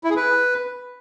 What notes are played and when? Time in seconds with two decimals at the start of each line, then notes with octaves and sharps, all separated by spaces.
0.04 E4
0.10 G#4
0.16 B4